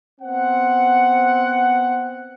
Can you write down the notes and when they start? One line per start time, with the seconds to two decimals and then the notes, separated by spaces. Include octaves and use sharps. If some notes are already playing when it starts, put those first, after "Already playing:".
0.21 B3 C4 F#5